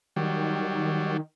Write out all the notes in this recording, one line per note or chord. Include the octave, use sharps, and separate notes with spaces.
D#3 F#3 G3